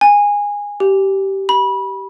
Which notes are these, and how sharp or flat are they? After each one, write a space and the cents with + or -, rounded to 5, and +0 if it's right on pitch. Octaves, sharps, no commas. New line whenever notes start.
G#5 -15
G4 -15
B5 -25